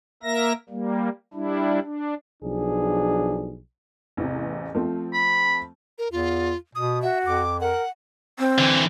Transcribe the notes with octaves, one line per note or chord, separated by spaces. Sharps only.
A#3 A#4 E5 A#6
G3 A#3
G3 D4 E4
D4
B1 F3 D4 G#4
A1 E2 C3
F3 A3 C4
B5
A#4
E2 F4
B2 D#6
F#4 E5
F2 D6
A#4 F#5
C4
D3 E3